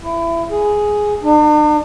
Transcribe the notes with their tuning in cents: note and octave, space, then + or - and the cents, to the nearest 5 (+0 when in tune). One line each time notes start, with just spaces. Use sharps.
E4 +25
G#4 +5
D4 +45